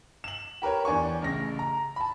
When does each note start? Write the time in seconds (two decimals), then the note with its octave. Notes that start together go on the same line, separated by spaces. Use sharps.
0.24 E7 F#7
0.62 G4 A#4 B4 C#5
0.85 E2 D4 G#5 C#6
1.22 A1 C#3 A#6
1.59 A#5
1.96 A5 B5